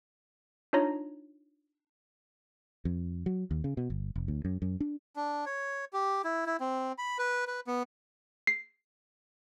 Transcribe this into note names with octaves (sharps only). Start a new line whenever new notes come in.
D4 D#4 F4 C#5 A#5 A#6
F2
F#3
D#2
C#3
B2
G1
F1
D2
F#2
F#2
D4
D4
C#5
G4
E4
E4
C4
B5
B4
B4
B3
C7